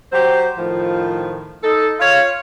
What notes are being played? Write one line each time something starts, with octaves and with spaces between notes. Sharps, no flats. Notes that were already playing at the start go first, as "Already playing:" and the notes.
F#3 G4 C5
A2 D#3 F3
D#4 A4
F4 C#5 F5